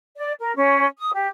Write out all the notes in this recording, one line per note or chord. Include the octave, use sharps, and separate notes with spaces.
D5
A#4
C#4
D#6
G4